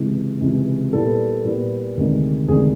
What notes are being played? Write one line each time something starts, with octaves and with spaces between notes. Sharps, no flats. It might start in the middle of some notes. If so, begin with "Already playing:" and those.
Already playing: C#2 C3 E3 G#3
C#2 C3 E3 G#3
A#2 G3 B3 E4 A4
A#2 G3 B3 E4
D2 C3 D#3 G#3
D2 C3 D#3 G#3 G#4